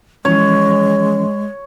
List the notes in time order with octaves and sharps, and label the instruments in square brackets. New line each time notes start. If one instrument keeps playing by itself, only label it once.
[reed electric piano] E3 F3 C#4 [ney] G#3 [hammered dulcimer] C#5